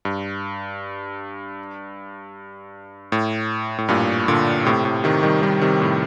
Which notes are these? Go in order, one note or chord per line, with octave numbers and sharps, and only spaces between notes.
G2
A2
A2
G2 A#2
A#2 D3
A2 C3
A2
C3 D#3
D#3 G3
D#3 G3
C3 D#3
A2 C3